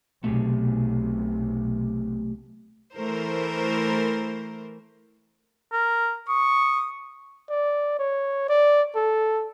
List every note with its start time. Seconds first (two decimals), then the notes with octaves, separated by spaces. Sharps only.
0.24 B1 C3 A3 G4 G#4
2.96 E3 A3 A#4 C5
5.72 A#4
6.29 C#6 D#6
7.49 D5
7.99 C#5
8.49 D5
8.95 A4